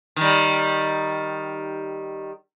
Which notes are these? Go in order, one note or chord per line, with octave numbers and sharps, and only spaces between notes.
D#3 G3